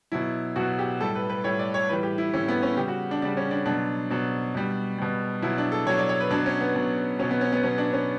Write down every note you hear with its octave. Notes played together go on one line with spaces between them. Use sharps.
B2 F#3 E4
B2 F#3 F#4
G4
A2 G3 A4
B4
B4
A2 G3 C#5
D5
C#5
A2 E3 G3 B4
G4
E4
A2 E3 G3 C#4
B3
C#4
C#3 G3 G4
F#4
D4
C#3 G3 D4
C#4
D4
B2 F#3 D4
B2 F#3
B2 G3
B2 G3
B2 F#3 E4
D4
A4
B2 F#3 C#5
D5
C#5
B4
B2 F#3 D4
C#4
B3
B2 F#3
B2 F#3 C#4
B3
C#4
B3
B2 F#3 C#4
D4
C#4